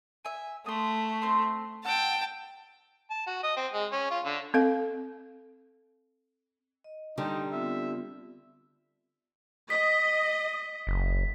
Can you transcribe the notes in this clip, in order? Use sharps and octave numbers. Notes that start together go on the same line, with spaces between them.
E5 G#5
A3 C6 D#6
C4 C6
F#5 G5 A5 E6
A5
F#4
D#5
C4
G#3
C#4
F4
D3
C4 A4 F5
D#5
D3 G3 D#4 C6
B3 C4 F4 E5
D#5 B6
F#1